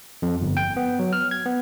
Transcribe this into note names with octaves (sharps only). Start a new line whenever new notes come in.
F2
G1
G5
B3
F#3
F6
G#6
B3